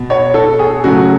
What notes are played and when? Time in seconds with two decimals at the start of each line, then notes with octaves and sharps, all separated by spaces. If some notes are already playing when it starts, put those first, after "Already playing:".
Already playing: B2
0.10 C#5
0.34 A4
0.59 G#4
0.84 C#3 F#3 A3 F#4